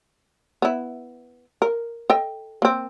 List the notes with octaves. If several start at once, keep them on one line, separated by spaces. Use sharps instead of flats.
B3 E4
A#4
A4 D#5 G5
A#3 C4